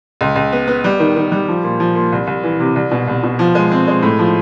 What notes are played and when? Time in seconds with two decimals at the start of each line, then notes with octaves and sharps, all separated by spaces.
0.21 C#2
0.36 C#2
0.52 B3
0.67 B3
0.84 G3
1.00 D#3
1.17 D#3
1.32 G3
1.48 F3
1.64 A#2
1.80 F3
1.95 A#2
2.12 C2
2.27 C2
2.43 E3
2.60 C3
2.76 C2
2.91 B2
3.08 C2
3.23 B2
3.39 F3
3.55 G#3
3.71 C4
3.88 G#3
4.02 A2
4.19 F3